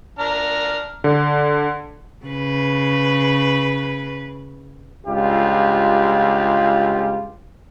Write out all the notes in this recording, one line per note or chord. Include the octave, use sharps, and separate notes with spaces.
D4 A#5 F6
D3
C#3 B4
C#2 G2 F4 G4